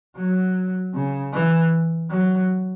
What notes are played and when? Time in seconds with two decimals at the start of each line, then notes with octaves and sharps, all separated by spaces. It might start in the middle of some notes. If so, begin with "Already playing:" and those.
0.16 F#3
0.94 C#3
1.33 E3
2.10 F#3